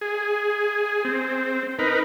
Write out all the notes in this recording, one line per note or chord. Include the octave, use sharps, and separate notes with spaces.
G#4
C4
D#4 A#4 B4